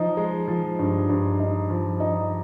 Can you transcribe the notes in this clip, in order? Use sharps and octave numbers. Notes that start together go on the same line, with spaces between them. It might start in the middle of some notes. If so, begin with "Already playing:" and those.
Already playing: F3 D#4
G#3
F3
G2
G2
D#4
F3
D#4